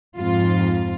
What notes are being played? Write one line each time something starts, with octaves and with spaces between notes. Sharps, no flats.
F2 G#2 F4